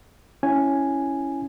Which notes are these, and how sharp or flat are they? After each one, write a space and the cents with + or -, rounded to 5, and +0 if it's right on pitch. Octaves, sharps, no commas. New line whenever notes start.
C#4 +0 E4 +0 G#5 +0